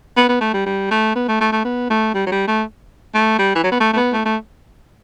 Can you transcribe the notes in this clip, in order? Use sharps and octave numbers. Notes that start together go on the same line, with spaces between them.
B3
B3
A3
G3
G3
A3
B3
A3
A3
A3
B3
A3
G3
F#3
G3
A3
A3
G3
E3
F#3
B3
A3
A3
B3
A3
A3